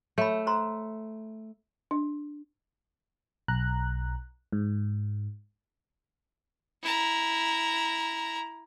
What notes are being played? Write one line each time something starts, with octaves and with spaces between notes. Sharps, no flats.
A3 C#5 B5
C5 A#5 C6
D4
B1 A#5 F#6
G#2
E4 A#5